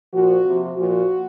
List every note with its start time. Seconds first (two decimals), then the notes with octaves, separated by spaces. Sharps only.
0.13 A#2 F3 F#4
0.45 C3 F3
0.77 A#2 F3 F#4